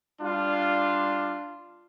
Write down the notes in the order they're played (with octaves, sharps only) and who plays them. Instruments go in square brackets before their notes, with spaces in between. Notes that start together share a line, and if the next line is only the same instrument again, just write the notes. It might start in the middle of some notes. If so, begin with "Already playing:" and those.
[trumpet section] G3 D4 F4